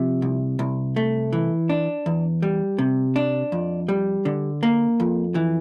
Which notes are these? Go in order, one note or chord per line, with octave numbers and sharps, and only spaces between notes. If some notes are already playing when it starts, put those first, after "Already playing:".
Already playing: C3 F3
C2
C2
A3
E3
D4
E2
G3
C3
D4
F2
G3
D3
A#3
F2
E3